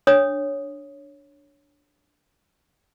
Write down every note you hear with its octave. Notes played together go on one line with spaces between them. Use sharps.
D4 C#5 D#6